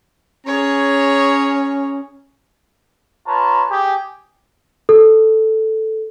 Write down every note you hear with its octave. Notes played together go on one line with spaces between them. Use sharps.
C#4 G#4 C#5 A#5
F4 B4 C#5 A5 A#5
G4 G#4
A4